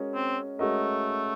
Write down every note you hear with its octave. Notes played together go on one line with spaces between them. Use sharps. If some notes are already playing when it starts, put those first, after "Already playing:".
Already playing: G#3 C#4 F#4 A#4 D#5
C4
G#3 A3 C#4 F#4 A#4 D#5